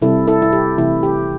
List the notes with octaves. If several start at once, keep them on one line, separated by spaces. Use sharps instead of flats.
C3 G3 C4 E4 A4
E4 A4
E4
G4
C3 E3 A3 E4
G4